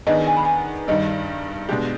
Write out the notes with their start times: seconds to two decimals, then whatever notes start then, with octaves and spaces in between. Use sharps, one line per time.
0.07 D#3 B3 D4 G#4 D#5
0.27 G#5
0.37 B5
0.45 G#5
0.88 G2 D#3 G3 D#5
1.69 B2 G#3 D4 G4